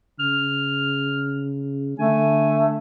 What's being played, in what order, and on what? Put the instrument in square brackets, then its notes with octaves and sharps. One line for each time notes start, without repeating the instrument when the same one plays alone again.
[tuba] C#3 [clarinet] F6
[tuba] D3 [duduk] A3 [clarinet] G#5